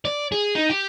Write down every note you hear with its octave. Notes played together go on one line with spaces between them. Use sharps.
D5
G#4
D#4
G4